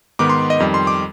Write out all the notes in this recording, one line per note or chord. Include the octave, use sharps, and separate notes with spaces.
G#2 D#3 B3 D6
C6
D#5
F2 D#3 G3
C6
D6